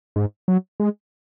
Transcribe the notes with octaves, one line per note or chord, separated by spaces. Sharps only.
G#2
F#3
G#3